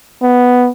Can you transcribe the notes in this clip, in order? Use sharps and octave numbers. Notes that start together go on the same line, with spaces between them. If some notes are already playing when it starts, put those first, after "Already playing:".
B3